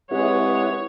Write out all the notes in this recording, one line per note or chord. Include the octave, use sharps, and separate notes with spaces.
C3 G#3 E4 G#4 B4 C#5 E5 F#5